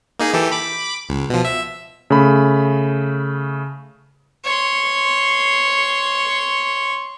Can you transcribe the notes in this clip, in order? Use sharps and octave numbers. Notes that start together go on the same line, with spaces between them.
A#3 D#4 G#4
E3 G4 A4
B5 D6
C#2
B2 F3
E5
C#3 A3 B5
C#5 C6